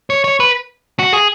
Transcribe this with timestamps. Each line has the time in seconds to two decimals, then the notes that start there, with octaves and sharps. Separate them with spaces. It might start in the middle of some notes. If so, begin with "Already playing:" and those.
0.10 C#5
0.24 C#5
0.40 B4
0.99 F#4
1.13 G#4